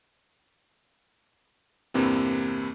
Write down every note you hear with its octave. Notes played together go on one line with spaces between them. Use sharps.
E2 G2 C3 E3 A#3 C4